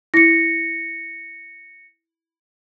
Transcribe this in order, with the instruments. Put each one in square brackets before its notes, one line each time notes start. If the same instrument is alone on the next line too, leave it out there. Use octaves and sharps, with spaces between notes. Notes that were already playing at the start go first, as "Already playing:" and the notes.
[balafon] E4 [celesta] A#6 C#7